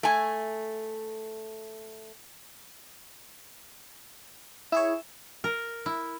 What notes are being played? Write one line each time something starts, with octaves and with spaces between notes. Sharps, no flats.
A3 G#5
E4 G#4 C#5 E5
A#4
E4